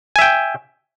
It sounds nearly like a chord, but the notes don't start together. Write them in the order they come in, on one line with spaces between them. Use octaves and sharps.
G#5 E5 G5